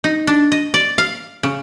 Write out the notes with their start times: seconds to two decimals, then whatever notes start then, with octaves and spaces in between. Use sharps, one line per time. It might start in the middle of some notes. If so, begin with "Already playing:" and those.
0.04 D#4
0.27 D4
0.52 D#5
0.74 D5
0.98 F5
1.43 C#3